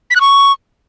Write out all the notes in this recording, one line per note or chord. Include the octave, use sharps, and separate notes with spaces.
B6
F#6
C#6